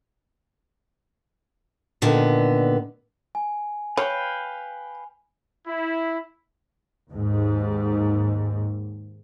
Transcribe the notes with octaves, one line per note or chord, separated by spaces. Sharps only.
A#2 D3 D#3 B3
G#5
B4 C#5 F5 G5
E4
D#2 G#2